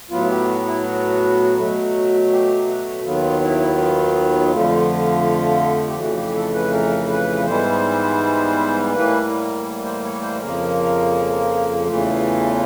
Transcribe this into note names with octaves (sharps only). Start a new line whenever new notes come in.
A2 F#3 B3 F4
G4
F#4
E4
F#4
B2 F#3 A3
G4
F#4
D#2 D#3 F#3 B3 F4
E4
F4
F2 D3 F3 A3
G4
F2 C#3 E3 A3 F#4
G4
A4
B4
A#4
B4
G#2 E3 G3 B3 C5
A2 E3 G3 A#3 B4
A#4
C5
C#5
C5
F2 C#3 F3 A#3 A#4
E2 C#3 E3 A3 F4